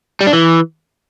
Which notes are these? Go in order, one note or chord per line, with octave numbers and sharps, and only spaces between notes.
G3
D4
E3